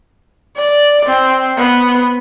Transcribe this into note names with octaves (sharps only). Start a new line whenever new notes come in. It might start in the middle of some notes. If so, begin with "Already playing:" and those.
D5
C4
B3